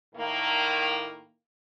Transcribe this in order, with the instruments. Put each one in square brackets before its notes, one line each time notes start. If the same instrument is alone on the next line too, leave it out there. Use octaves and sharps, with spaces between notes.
[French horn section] A2 D#3 A#3